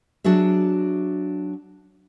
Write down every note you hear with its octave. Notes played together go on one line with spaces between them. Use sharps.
F#3 D4 F#4 G#4 E5